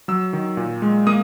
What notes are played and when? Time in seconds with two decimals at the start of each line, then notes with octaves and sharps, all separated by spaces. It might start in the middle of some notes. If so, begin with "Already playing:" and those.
0.08 F#3 E6
0.33 D#3
0.57 A#2
0.82 G#3
1.07 A#3 D#6